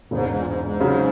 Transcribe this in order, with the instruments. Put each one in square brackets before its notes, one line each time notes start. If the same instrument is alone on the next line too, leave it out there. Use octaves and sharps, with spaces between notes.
[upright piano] E1 E2 C#3 [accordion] G#2
[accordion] G#2
A#2
G#2
G#2
[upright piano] C#3 F#3 C#4